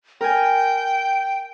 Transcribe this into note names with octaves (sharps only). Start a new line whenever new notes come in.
A#4 G5 G#5